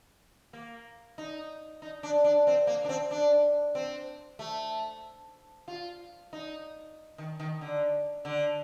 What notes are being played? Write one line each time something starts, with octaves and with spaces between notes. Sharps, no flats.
A#3
D#4
D#4
D4
D4
C4
A#3
D4
C4
D4
C4
A3
F4
D#4
D#3
D#3
D3
D3